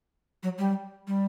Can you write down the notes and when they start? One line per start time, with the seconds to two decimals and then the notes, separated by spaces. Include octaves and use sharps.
0.43 F#3
0.58 G3
1.07 G3